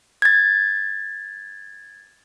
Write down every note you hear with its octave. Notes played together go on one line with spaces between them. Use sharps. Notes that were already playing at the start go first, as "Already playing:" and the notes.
G#6 A6